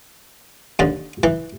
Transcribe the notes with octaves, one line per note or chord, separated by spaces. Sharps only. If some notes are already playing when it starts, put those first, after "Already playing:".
D#2 D3
E3